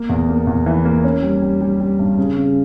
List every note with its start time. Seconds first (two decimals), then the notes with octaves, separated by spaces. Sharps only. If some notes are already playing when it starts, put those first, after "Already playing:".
Already playing: A#3
0.09 E2
0.29 A#3
0.47 E2
0.66 E3
0.85 A#3
1.04 C#4
1.23 G3
1.42 G3
1.61 G3
1.80 G3
1.99 G2
2.18 C#3
2.37 C#3